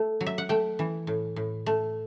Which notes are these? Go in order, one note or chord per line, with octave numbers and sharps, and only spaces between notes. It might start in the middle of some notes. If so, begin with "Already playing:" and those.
Already playing: A3
F#3
E5
F#5
A3 G5
E3
A2
A2
A3